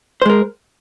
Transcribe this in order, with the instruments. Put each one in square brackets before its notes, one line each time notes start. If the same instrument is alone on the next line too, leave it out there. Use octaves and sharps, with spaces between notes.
[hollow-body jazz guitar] C5
G#3
A#4